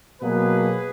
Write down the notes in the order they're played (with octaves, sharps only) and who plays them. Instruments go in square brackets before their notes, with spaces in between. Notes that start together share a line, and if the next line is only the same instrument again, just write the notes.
[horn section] B2 F#3 A#3 G#4 B4